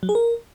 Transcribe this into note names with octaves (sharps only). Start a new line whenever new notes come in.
F#3
G#4
A#4